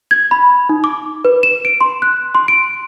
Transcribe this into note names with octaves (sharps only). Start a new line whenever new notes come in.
G#6
B5
D#4
D6
B4
E7
D7
C6
F#6
C6
D7